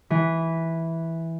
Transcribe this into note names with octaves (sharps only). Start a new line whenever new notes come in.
E3